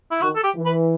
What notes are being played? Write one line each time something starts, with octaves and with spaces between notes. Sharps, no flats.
E4
D#3 F#4
A4
G4
E3
B4